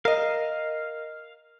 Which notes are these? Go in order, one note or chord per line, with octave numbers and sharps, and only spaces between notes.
A#4 D#5 F5